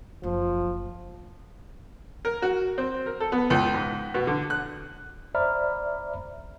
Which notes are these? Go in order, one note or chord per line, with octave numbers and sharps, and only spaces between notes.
F#1 F3
A#4
F#4
C4
A#4
A4
B3
C#2
G#2
B2
D3
F#6
C5 D5 E5 A#5 B5 F6